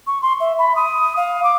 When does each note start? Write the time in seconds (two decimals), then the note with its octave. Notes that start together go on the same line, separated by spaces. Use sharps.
0.07 C#6
0.22 C6
0.40 E5
0.59 B5
0.76 D#6
1.17 F5
1.44 D6